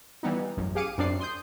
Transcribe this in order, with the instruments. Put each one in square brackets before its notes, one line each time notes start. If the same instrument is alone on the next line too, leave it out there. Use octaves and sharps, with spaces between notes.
[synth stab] E3 G3 B3 D#4
A1 F#2
G4 G#4 F5 D6 C#7 D#7
F#2 C4 D4 D5 C7
C6 D#6 G6